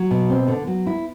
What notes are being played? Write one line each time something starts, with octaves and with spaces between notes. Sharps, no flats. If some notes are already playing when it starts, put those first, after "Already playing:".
Already playing: F#3
B2
C4
D3
F#3
E4